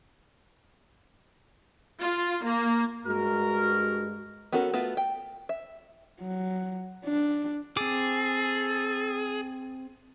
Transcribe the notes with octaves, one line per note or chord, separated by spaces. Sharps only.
F4
A#3
G2 G#3 F#4 A#4
B3 C#4 F#4 A4 A#4
A3 B3 F4 F#4
G5
E5
F#3
D4
C4 G#4 A4 D6